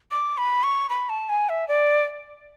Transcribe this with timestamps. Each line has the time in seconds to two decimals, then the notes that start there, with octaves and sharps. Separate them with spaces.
0.11 D6
0.38 B5
0.63 C#6
0.90 B5
1.09 A5
1.29 G#5
1.49 E5
1.68 D5